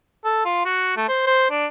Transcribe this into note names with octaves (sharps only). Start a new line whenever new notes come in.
A4
F4
F#4
A3
C5
C5
D4